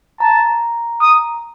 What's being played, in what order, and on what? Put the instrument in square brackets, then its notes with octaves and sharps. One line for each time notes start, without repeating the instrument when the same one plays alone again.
[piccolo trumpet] A5 [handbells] A#5
[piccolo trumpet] D#6